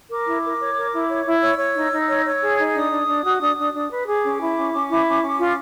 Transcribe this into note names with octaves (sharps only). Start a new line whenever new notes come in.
A#4 D6
E4
A#4
C#5
A#4
E4
C#5
E4
C#5 E6
C#5
D#4
D#4
C#5
C#5
G#4
D#4
D4 D#6
D4
D4
F#4
D4
D4
D4
B4
G#4 D6
C#4
E4
C#4
C#4
E4
C#4
C#4
F4